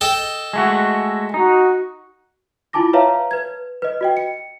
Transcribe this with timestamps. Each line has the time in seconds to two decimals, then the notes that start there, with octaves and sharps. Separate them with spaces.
0.01 A4 D#5 G5
0.53 G#3 A3 F#4
1.34 D#4 F#4
2.73 E4 F4 G#5 A5 D6 A#6
2.93 B4 C#5 E5 F5 A5 A#5
3.31 B4 G#6
3.82 B4 D#5
4.01 F#4 D#5 G5
4.17 C#7